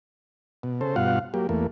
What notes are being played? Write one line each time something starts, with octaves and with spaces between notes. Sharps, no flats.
B2
C#3 A4 C5
G2 B2 F4 F5 F#5
F#3 A#3 G4
E2 A3 A#3